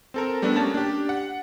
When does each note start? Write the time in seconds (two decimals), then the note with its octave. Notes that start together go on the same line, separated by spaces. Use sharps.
0.14 C4 A4 A#4
0.42 G3 A3 B3 D4
0.55 A#3 C#4 A5 A6
0.74 D4 G4
1.09 F#5